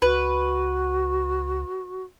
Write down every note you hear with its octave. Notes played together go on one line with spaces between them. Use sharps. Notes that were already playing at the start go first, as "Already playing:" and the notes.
C#2 F#4 B4